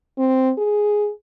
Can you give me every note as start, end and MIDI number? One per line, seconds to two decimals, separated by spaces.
0.18 0.52 60
0.58 1.11 68